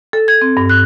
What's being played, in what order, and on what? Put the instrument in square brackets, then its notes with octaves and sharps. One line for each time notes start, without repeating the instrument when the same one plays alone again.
[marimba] A4
G#6
C4
G2
F#6